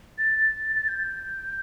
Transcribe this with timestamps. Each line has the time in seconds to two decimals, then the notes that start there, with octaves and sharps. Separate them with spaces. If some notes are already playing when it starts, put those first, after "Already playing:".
0.18 A6
0.76 A6
0.88 G6